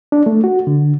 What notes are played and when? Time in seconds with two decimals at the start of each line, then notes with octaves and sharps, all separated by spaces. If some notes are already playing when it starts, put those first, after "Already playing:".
0.12 D4
0.26 A3
0.44 F#4
0.67 D3